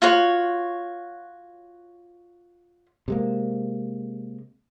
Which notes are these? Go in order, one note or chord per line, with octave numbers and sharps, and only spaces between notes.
F4 F#4 C#5
C3 G#3 A#3